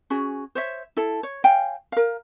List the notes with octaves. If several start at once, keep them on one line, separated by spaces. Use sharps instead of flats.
C#4 F#4 G#4
C5 C#5 E5
E4 A4
C#5
C#5 F5 G5 G#5
A#4 F5